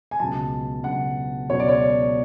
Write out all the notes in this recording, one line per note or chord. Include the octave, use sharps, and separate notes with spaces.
G#5
C#2 B2 F#3 A5
C#2 B2 F#3 F#5
C#2 B2 F#3 C#5
D5
C#5